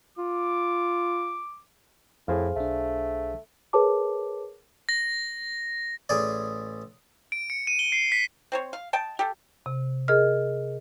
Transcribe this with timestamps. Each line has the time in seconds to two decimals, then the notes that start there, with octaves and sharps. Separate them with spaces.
0.18 F4 D6
2.28 F2 A2 G#4 C5 F5
2.56 B1 A3 D4
3.73 G#4 A#4 B4 C#5 A5 D6
4.89 A#6
6.09 A1 G#4 D5
7.32 D7
7.50 C#7
7.67 D#7
7.79 G7
7.92 C7
8.12 B6
8.52 C4 C5 C#5
8.73 F5
8.93 D#5 G5 A5
9.19 G4 A4
9.66 C3
10.08 G#4 A#4 D#5 F6